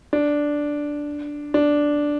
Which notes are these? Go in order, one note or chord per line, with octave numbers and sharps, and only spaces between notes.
D4
D4